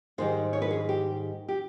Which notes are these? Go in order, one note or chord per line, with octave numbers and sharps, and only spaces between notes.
G#2 D#3 G3 C5
C#5
B4
G#4
G4
G4